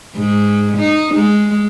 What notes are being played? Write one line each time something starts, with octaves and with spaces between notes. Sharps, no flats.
G#2
D#4
G#3